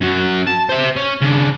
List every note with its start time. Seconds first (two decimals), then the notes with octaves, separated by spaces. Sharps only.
0.01 F#2 F#3
0.47 A5
0.69 C5 E5
0.96 C#4
1.21 C#3 D4